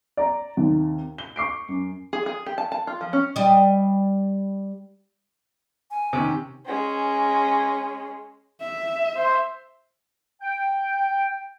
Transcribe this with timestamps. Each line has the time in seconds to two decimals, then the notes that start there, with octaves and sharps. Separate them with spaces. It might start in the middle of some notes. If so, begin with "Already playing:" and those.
0.17 D5 A#5
0.57 D#2 C3
1.18 G7
1.36 C#6 D6 C7 D7
1.69 F#2
2.13 G#4
2.26 G#4
2.46 G4
2.58 A5
2.72 A5
2.87 F4
3.01 F3
3.13 C#4
3.36 G3 D#5
5.91 G#5
6.13 C3 D#3 C#4
6.66 G#3 C#4
8.61 E5
9.16 C5
10.41 G5